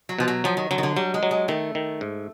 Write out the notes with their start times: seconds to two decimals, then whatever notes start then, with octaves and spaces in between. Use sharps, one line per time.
0.09 F#3
0.19 B2 F3
0.28 F#3
0.44 F3 F#3
0.57 D#3
0.71 D3 F#3
0.78 D#3
0.83 D3
0.96 F#3 G3
1.14 G#3
1.23 F#3
1.31 G#3
1.48 D#3 A3
1.75 D#3
2.01 G#2